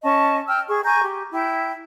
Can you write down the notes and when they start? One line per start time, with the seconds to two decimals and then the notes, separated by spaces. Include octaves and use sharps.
0.04 C#4 D#5 A5 C#6
0.47 G5 E6 F6
0.68 G#4 C#6
0.84 G#5 A#5 C#6 G6
1.02 G4
1.31 E4 G5